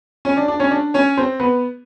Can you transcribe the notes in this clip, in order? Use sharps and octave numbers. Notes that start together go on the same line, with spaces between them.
C#4 C#5
D4 D5
D4 D5
C#4 C#5
D4 D5
C#4 C#5
C4 C5
B3 B4